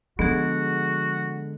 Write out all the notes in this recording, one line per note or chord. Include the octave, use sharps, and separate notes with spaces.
D3 F3 G#3 B3 F#4 G#4